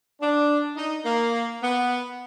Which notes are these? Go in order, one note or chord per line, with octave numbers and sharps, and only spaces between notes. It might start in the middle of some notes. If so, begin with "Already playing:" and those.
D4
D#4
A#3
B3